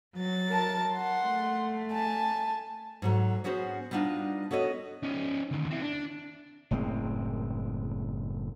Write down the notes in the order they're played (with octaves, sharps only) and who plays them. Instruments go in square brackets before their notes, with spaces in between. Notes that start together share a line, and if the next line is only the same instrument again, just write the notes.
[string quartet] F#3 A6
[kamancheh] A#4 A5
F#5 C6
[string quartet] A3
[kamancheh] G#5 A5
[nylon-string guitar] G#2 F#3 A3
B3 C#4 F#4 G#4 C5
G3 B3 D4 D#4 F4
B3 F#4 A4 C#5 D#5
[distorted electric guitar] C#4 D#4
D2 D#3
C4 E4
D4
[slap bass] F#1 A2 G#3 C4